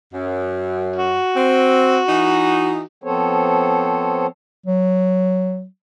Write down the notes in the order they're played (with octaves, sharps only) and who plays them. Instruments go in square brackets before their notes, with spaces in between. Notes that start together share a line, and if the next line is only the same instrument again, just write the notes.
[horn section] F#2
[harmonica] F#4
[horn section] C4
E3 D#4
[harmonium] F3 B3 C4 A4 C5 C#5
[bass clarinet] F#3